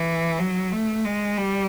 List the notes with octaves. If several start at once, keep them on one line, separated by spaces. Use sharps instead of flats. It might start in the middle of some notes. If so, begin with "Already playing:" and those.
Already playing: E3
F#3
A3
G#3
G3